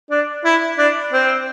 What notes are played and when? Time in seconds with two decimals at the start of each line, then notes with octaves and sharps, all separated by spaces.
0.10 D4
0.44 E4
0.78 D4
1.12 C4